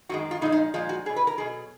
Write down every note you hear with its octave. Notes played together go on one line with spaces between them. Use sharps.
F#2 D#3 G#3 F#4
F4
A#2 F3 G#3 D#4
D#4
A#2 F3 G#3 F4
F#4
B2 F#3 G#4
B4
A#4
B2 F#3 G#4